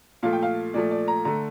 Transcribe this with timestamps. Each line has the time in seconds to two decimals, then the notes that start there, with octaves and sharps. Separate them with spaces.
0.23 A#2 F3 A3 F5
0.33 G5
0.42 F5
0.74 A#2 F3 A3 D5
0.91 D5
1.08 A#5
1.25 D3 A3 A#5